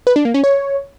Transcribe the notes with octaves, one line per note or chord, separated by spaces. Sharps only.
B4
D4
A#3
C#4
C#5